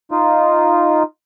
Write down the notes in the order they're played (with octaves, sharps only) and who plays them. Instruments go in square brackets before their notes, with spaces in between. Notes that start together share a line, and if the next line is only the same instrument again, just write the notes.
[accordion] D#4 F4